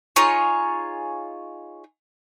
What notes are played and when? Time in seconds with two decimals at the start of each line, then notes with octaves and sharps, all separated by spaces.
0.16 D#4 F4 G#4 C#5